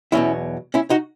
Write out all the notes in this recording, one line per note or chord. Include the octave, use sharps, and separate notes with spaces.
E2 B2 F#3 C#4 E4
C#4 E4
D#4 F#4